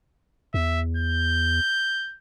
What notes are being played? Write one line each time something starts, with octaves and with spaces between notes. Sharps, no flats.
E2 E5
G6